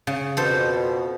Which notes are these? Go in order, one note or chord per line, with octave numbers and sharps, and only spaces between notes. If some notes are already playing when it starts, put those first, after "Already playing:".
C#3
F2 B2 A4 C5